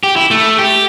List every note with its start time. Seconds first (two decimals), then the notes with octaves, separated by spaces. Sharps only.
0.03 G4
0.16 E4
0.31 A3
0.59 G4